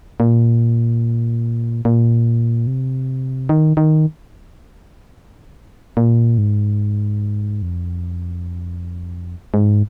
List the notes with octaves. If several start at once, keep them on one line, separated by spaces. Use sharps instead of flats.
A#2
A#2
C3
D#3
D#3
A#2
G#2
F2
G#2